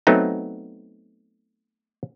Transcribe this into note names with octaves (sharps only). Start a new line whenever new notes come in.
F#3 A3 B3 C4 D#4